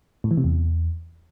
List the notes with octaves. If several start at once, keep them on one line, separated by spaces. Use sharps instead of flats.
A2
E3
C3
E2